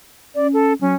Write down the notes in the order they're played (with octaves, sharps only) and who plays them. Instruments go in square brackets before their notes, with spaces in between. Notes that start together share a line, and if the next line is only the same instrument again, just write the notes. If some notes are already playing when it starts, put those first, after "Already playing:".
[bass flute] C#4 [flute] D5
[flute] A4
[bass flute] F#3 [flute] C#4